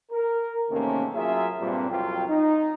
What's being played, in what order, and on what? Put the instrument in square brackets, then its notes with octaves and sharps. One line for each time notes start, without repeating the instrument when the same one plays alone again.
[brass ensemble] A#4
E2 C3 D#3 A3 A#3 C#4
F#3 F4 G#4 A#4 E5
G2 A#2 C4
C2 F2 F#3 F4 G5
D#4